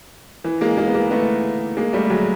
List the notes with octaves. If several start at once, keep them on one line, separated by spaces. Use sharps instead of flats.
E3
G#3 A#3
G#3 A#3
B3
G#3 A#3
A3 B3
G#3 A#3
G3 A3
F#3 G#3